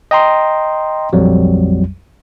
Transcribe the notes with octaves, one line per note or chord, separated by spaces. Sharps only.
D#5 G5 A#5 C6
A#1 F2 F#3 G3